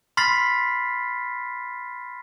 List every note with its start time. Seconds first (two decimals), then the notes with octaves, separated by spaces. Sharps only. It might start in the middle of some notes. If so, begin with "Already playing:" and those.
0.17 B5 C6 F6 A6 B6 C7